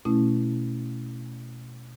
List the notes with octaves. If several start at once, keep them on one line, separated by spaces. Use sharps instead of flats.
B2 A3 C#4 E4